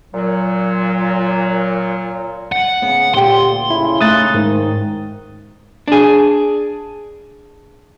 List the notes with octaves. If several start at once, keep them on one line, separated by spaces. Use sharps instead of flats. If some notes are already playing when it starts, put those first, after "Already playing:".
A#2 F#3
F#5
C#3 B3
D2 A#2 G4 G5 C6
C#3 E4
A3 D#4 D#6 F#6 A6
G#2 D#3
D4 G#4